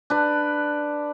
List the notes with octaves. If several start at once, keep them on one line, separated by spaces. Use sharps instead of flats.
D4 B4